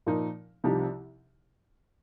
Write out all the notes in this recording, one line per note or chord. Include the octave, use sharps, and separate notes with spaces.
A#2 F3 D#4 A#4
C2 C3 F3 D#4 G4